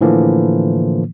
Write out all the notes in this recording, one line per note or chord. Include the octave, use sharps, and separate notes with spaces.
A2 D3 E3 F3 A#3